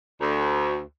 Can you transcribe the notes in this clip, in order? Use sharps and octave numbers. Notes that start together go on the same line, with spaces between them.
D2